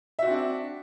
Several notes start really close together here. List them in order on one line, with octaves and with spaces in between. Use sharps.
E5 F#4 C4 D4